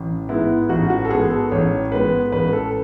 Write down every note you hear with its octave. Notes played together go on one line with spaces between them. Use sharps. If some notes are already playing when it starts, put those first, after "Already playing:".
Already playing: A1
G#2 G#3 B3 E4
A1 F#4
F#4
A4
G#2 G#3 B3 G#4
A4
A1 C#5
G#2 G#3 B3 B4
A1 B4
A4